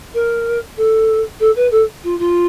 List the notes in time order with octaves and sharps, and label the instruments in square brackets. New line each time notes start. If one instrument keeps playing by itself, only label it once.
[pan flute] A#4
A4
A4
B4
A4
F4
F4